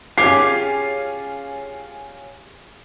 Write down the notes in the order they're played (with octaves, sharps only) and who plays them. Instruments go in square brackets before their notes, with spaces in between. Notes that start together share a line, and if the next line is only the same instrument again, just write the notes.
[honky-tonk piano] C#4 F4 [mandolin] G4 G#4 [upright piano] C7